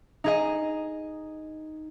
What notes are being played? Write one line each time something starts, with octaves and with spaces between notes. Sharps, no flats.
D#4 G#4 D#5